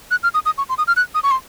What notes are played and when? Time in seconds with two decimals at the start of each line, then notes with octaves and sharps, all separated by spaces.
0.11 F#6
0.23 F6
0.34 D#6
0.46 D#6
0.58 C#6
0.69 C6
0.78 D#6
0.87 F6
0.96 F#6
1.15 D#6
1.23 C#6
1.31 C6